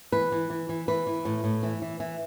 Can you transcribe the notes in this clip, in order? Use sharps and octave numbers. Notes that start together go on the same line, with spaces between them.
E3 B4
E3
E3
E3
E3 B4
E3
A2
A2
E3
E3
E3